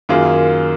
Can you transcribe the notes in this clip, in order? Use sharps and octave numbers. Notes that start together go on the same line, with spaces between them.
F#2 D#3 A#3 F4 G#4